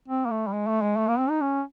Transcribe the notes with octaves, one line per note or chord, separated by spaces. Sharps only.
C4
A#3
A3
G3
G#3
A3
G#3
A3
A#3
C4
D#4
C#4